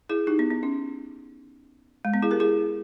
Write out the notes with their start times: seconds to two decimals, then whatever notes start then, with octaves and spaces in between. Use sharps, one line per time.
0.09 E4 G#4
0.27 D#4 G4
0.39 B3
0.51 B3
0.63 C#4
2.05 G#3
2.14 B3
2.22 E4 G#4
2.31 G4 A#4
2.40 E4 G#4